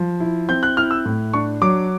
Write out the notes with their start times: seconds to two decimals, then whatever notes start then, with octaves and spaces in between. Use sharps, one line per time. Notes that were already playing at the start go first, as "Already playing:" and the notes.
Already playing: F3
0.20 E4
0.49 C4 G6
0.63 F#6
0.77 E4 F6
0.91 E6
1.05 A2
1.33 D4 C#6
1.62 F#3 D6